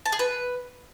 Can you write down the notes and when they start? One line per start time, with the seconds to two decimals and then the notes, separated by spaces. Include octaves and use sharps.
0.06 A5
0.12 G#4
0.19 B4